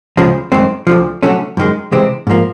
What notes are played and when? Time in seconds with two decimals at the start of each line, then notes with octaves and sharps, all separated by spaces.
0.17 D2 C#3 F3 G#3
0.52 F#2 D#3 G#3 C4
0.87 D2 D3 F3
1.23 D3 F#3 A3 C#4
1.57 F#2 D#3 G#3
1.92 C3 E3 G#3 C4
2.27 G#2 F3 A#3